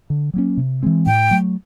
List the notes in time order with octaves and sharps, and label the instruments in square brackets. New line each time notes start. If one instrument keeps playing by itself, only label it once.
[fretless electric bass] D3
F#3 A#3 C#4
C3
E3 G#3 C4
[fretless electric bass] A2 [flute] G5
[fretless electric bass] F#3 A3